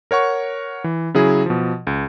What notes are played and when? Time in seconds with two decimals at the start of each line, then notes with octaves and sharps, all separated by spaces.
0.11 A#4 C#5 F#5 C#6
0.84 E3
1.14 C#3 F#3 E4 G#4
1.46 B2 F3
1.87 C#2